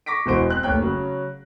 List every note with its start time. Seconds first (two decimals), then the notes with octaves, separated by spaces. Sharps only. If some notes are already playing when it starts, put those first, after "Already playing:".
0.06 C#6 D6 A#6 B6 D7
0.26 E1 B2 E3 F#4 C5 D7
0.49 C4 F#6 F#7
0.63 F1 D#2 C#5 G5 F#6
0.81 C#3 F#3 C#4